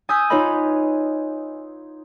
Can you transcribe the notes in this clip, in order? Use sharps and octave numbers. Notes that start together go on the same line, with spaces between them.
G#5 D#6 E6 G6 B6
D#4 F4 B4 C#5 D#5 B5